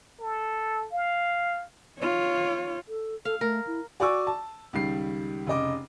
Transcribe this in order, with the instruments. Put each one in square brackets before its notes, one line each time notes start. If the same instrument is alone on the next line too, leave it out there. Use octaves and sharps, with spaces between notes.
[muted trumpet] A4
F5
[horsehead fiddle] F4 C#5
[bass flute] A4
[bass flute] A4 [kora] F5
[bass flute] A3 [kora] A#4
[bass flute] E4
[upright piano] F#4 D5 G#5 C#6 D6 E6
A5
C#2 D#3 G3 C7
F1 C#3 D#5 D6